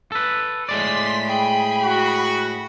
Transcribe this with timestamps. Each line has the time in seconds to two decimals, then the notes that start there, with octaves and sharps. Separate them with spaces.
0.12 A4 B4
0.69 A2 G#3 D5 C6 B6
1.26 G#4 G5 B5
1.82 F#4